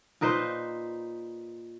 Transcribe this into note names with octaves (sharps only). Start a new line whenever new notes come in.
A#2 D#4 B4 C5